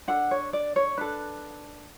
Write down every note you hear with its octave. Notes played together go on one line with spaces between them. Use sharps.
D4 A4 F#5
C#5
D5
C#5
D4 A4 B4